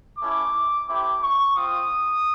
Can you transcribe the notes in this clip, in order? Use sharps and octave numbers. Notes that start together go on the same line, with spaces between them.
A3 C#4 E4 D6
A3 C4 E4 G4 D6
C#6
C4 F4 D#6